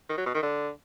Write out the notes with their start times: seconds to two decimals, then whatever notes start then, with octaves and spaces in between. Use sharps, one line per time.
0.09 D#3
0.18 F#3
0.26 B2
0.34 D#3
0.43 D3